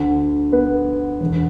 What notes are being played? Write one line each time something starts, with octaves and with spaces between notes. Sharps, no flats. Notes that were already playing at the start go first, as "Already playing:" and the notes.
Already playing: D2 D3
B3 B4
E1 E2 D3